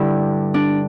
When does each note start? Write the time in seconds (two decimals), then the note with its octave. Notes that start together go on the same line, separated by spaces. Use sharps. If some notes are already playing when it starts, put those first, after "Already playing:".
Already playing: G2 D3 G3 E4
0.54 D4